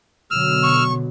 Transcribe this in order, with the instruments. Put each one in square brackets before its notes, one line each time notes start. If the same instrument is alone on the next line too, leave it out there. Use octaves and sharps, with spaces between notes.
[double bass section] B2 D3 F#3 [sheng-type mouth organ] E6 F6
[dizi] C#6